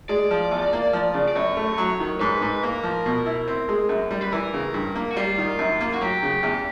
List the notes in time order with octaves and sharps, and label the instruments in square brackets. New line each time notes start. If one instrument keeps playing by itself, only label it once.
[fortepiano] G#3 [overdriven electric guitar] D5
[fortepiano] F3
E2
A#3
F3
C#3
[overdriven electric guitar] D5
[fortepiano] F#2 [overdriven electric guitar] C#5
[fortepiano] A3
F#3
D#3
[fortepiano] G#2 [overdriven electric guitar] B4
[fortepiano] G#2
[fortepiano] A#3 [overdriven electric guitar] A#4
[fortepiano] F3
B2
E4
C4
G#3
F#2
G3
[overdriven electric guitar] B4
[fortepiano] E3 [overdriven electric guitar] A#4
[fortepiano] C#3
G2
A#3
[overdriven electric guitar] F#4
[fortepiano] G3 [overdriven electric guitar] F4
[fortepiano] D#3
F#2
A#3
[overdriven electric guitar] F#4
[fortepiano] F#3 [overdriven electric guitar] G4
[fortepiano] C#3
E2